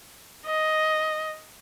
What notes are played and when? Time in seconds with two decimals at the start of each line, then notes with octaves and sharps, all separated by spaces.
0.45 D#5